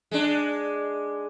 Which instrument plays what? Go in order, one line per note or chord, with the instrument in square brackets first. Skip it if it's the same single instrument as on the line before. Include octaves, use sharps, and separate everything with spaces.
[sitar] G#3 D4